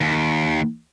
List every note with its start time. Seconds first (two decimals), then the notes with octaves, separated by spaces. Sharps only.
0.01 D#2